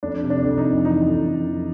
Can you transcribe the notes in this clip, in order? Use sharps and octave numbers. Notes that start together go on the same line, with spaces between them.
F2 D4
C3
D4
F2
D#4
F2
E3 D#4
F2
F2
E3